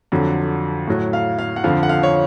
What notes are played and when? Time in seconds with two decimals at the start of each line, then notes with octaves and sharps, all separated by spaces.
0.12 F2 D3 F#3
0.87 A2 F#3
1.13 F5
1.39 F5
1.56 F#5
1.64 F2 D3 F3 F5
1.83 F#5
1.89 F5
2.03 C#5